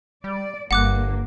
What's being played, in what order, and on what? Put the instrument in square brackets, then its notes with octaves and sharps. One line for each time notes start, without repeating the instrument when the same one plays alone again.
[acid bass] G3 [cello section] D5
[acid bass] G1 [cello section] G2 A#3 [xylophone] F#5 D6 F#6